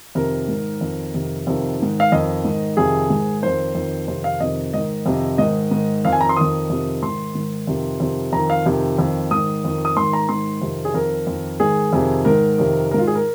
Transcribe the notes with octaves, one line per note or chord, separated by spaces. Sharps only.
F2 C3 D#3 A#4
G#2 D#3
F2 D#3
F2 C3 D#3
F2 C3 D#3
G#2 D#3
F5
F2 D#3 D#5
G#2 D#3
F2 C3 D#3 G#4
G#2 D#3
F2 D#3 C5
F2 D#3
F2 C3 D#3 C5
F5
F2 C3 D#3 D#5
G#2 D#3 D#5
F2 C3 D#3
G#2 D#3 D#5
G#2 D#3
F2 D#3 F5
G#5
A#5
C6
F2 D#3 D#6
F2 C3 D#3
G#2 D#3 C6
G#2 D#3
F2 C3 D#3
F2 C3 D#3
F2 D#3 A#5
F5
F2 C3 D#3
F2 D#3
G#2 D#3 D#6
F2 D#3
D#6
G#2 D#3 C6
A#5
G#2 D#3 C6
F2 C3 D#3
G#4
F2 D#3 A#4
F2 D#3
G#2 D#3 G#4
F2 C3 D#3
G#2 D#3 A#4
F2 C3 D#3
G#2 D#3 F4 A#4
G#4
A#4